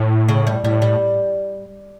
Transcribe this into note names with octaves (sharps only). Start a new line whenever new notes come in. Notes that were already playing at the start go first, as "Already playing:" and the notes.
Already playing: A2
C#3
G3
A2 G3
G3